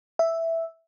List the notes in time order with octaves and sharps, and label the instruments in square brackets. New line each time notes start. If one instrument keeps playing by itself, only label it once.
[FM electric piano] E5